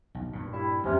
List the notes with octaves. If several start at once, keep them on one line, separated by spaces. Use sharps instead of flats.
B1
G2 A#2
G3 E4
E2 C3 G#3 C#4